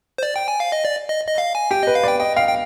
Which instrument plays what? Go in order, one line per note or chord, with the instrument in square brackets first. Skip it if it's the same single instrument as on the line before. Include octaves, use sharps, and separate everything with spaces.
[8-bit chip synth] C5
D5
G5
G#5
F5
D#5
D5
D#5
D#5
F5
G#5
[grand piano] G4 [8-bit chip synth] G5
[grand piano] B4 [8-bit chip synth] D#5
[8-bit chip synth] F5
[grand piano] D5 [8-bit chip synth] G5
[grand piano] D#5 [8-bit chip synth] G5
[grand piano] F5 [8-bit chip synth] G5
[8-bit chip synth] G5